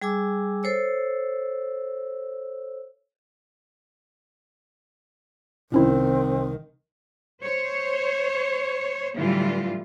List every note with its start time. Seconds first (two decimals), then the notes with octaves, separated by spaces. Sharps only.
0.02 G3 G#4 G#5 D6 E6
0.63 A4 C5 C#5 E6
5.72 C2 A2 D#3 C4 C#4 E4
7.41 C5 C#5
9.15 A2 D3 E3 F#3 G3 F4